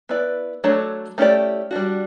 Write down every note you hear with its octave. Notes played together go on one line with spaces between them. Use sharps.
B3 E4 B4 D5
F#3 A3 D4 A4 C#5
A3 C#4 E4 G4 D5
G3 D4 F#4